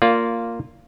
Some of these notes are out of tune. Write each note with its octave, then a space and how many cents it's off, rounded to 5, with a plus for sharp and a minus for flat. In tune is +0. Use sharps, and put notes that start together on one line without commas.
A#3 -10 F4 +0 D5 -30